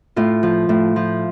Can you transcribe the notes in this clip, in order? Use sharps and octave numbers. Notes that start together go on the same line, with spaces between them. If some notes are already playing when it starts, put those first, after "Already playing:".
A2 F4
F3
A2
F3